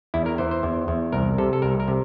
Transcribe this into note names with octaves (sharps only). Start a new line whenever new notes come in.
E2 E4
A#4
E3 C5
C5
E2
E2
C2 A#4
C3 A4
A4
C2 A#4
A#4
C3